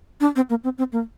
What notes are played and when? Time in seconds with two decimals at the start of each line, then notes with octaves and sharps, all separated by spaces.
0.21 D4
0.36 C4
0.50 A#3
0.64 C4
0.78 C4
0.92 A#3